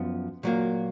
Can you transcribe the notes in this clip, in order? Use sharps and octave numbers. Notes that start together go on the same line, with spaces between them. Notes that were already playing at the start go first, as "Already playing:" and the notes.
Already playing: F#2 F3 B3
A#2 F#3 A#3